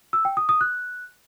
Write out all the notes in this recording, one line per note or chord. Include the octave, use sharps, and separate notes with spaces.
E6
G5
D#6
D#6
F#6